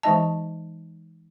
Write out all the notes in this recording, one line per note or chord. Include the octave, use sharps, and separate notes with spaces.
E3 G#3 D#4 D#5 A5